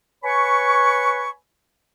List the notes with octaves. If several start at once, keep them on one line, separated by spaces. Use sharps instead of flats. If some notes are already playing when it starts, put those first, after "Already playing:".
B4 C#5 G#5 B5 C#6